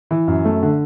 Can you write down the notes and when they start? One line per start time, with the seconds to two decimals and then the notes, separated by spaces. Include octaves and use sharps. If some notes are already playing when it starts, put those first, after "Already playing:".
0.11 E3
0.28 F#2
0.45 A3
0.63 D3